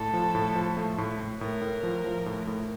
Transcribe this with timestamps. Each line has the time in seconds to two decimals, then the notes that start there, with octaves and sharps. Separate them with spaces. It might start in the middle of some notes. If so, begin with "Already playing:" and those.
Already playing: A2 A4
0.14 F3
0.35 A2
0.55 F3
0.77 A3
0.98 A2
1.20 A2
1.41 A2 A#4
1.61 A2
1.83 F3
2.04 F3
2.26 A2
2.47 A2